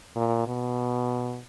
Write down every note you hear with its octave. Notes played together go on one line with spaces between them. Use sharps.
A#2
B2